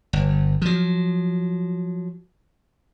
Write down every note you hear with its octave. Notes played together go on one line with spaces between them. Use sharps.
G1
F3 F#3